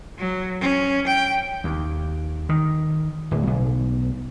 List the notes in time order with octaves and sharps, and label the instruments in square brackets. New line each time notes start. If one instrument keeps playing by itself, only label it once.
[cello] F#3
C#4
G5
[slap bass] D#2
D#3
D1
B1